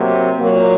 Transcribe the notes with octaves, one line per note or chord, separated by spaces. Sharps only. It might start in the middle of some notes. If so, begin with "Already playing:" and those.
Already playing: C3 F#3 A#3
A#2 F#3 A#3